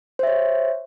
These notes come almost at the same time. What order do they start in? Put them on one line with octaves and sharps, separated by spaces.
C5 E5 C#5